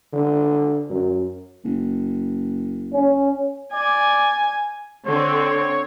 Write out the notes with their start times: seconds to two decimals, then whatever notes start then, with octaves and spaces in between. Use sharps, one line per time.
0.13 D3
0.89 F#2
1.64 F#1
2.93 C#4
3.74 D5 G#5
5.07 D3 C4 C#5